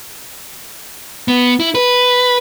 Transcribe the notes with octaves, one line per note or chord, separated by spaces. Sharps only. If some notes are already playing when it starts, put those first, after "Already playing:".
B3
E4
B4